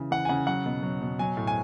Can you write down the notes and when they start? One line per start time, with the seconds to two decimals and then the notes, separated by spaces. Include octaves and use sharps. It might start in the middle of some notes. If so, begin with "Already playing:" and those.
Already playing: C#3 E3
0.11 E3 F#5
0.25 G#5
0.29 C#3 F#5
0.47 F#3 F#5
0.66 B2
0.83 F#3
1.01 B2
1.19 F#3 G#5
1.37 A2
1.47 G#5